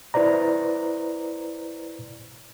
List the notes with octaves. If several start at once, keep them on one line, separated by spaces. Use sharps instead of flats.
E4 B4 C5 D5 A#5